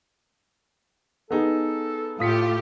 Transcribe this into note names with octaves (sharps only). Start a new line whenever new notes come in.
B3 D#4 G#4 A4
A2 A3 F4 G4 D#6 B6 C#7